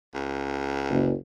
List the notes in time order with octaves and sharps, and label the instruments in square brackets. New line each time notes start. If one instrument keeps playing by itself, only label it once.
[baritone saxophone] C#2
[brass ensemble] F#1